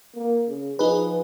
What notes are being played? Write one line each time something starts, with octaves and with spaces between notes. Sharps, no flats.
A#3
C#3
F3 D#4 G#4 B4